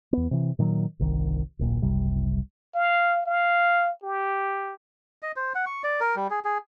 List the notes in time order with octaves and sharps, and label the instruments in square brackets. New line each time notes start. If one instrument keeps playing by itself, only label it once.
[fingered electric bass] E2 B3
C3 E3
A#2 D#3 F3 F#3
G1 C2 D#3
D1 A#1 A#2
F#1 C2 C3 G3
[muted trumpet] F5
F5
G4
[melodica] D#5
C5
F#5
C#6
D5
A#4
G3
G#4
G#4